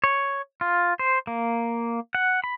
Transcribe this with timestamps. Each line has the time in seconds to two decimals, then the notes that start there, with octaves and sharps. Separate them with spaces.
0.04 C#5
0.61 F4
0.99 C5
1.27 A#3
2.15 F#5
2.44 B5